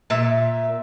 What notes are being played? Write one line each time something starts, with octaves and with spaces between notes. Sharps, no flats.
A#2 E5